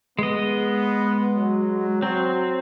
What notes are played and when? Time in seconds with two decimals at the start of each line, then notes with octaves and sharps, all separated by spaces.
0.19 G#3 B3 D#5
1.36 F#3
2.02 F#3 C4